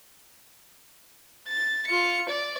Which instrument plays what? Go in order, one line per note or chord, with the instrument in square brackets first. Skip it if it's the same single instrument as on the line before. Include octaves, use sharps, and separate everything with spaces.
[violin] A6
F4 C#7
D5